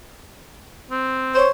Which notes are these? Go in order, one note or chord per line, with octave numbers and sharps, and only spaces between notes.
C4
C5 C#5